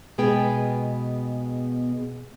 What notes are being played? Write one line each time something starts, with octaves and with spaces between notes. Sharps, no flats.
B2 G#3 B3 G#4 G5